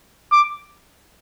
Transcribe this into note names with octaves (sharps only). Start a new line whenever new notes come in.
D6